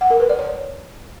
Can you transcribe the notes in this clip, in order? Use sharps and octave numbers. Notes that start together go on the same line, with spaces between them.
F#5
A#4
B4
D5
C#5